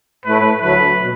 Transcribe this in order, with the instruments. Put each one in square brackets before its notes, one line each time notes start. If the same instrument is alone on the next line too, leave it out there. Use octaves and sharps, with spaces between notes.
[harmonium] A2 A3 E4 [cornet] B4
[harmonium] D2 D3 F#3 A3 [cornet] B4
[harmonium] B2